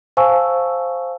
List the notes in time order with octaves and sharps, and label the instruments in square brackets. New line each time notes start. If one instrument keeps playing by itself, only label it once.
[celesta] C5 F5 G#5 A5 C#6 E6